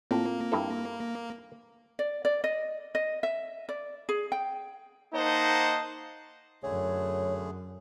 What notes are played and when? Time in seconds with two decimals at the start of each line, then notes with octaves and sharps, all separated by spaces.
0.11 A2 A#3 C4 F4
0.52 G2 E4 A4
1.99 D5
2.25 D5
2.44 D#5
2.95 D#5
3.23 E5
3.69 D5
4.09 G#4
4.32 G5
5.14 A#3 D#4 C5 D#5 F#5 A5
6.63 F#2 D3 A3 G#4 C#5